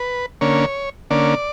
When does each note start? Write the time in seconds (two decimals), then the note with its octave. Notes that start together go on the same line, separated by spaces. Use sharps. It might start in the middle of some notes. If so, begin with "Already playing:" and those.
Already playing: B4
0.41 D3 A#3 C#4 C#5
1.10 D3 A#3 C#4 D5